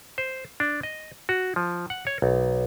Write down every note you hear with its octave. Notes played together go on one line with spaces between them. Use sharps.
C5
D4
D#5
F#4
F3
F#5
C#5
B1